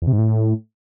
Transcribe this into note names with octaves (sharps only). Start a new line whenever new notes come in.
E2
C3
G#2
A2